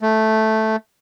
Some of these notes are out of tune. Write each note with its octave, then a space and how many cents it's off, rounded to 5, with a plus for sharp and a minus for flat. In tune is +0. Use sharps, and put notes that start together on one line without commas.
A3 -5